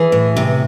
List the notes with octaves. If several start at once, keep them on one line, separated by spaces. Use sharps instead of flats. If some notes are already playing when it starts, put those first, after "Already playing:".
Already playing: E3 G#4
A2
C3